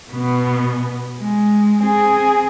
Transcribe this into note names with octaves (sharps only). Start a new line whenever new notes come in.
B2 B3
G#3
C4 G#4